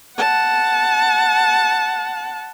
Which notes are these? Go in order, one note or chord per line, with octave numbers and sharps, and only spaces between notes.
F#5 A5